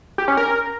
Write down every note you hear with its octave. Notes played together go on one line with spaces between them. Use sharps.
G4
C#4
A#4